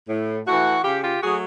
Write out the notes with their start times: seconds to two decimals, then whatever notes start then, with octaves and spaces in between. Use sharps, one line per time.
0.09 A2
0.46 E3 A3 E4 F#4
0.84 C#3 F4 G4
1.03 F4 G4
1.21 F#3 A3 F#4 G#4